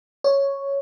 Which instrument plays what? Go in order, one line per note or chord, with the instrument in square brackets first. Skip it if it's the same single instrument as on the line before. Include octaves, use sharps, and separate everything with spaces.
[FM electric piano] C#5